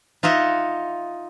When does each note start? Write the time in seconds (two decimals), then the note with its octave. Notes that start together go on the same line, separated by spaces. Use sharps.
0.23 D#4 F4 D#5 E5 F#5